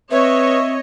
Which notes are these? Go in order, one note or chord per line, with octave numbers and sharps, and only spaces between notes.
C4 B4 C#5 D#5 E5